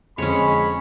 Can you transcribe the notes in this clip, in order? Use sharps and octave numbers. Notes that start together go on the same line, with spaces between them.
F2 D3 G#3 C#4 C#5 B5